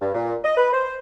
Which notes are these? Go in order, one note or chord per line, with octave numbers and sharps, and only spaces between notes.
G2
A#2
D#5
B4
C5